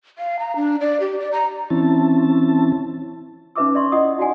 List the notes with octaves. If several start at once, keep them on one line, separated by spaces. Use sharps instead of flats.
F5
A#5
D4
D5
G4
D5
A#5
E3 C4 C#4 E4 A5
C#4 D#4 B4 E5 D6 E6
D5 E5 C6 C#6
E4 D5 D#5 F#5 D#6
D#4 F#4 D5 F#5 G#5